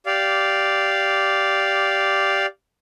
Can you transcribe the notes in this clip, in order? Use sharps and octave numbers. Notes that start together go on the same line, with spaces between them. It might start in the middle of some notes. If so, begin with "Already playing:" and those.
G4 D5 F5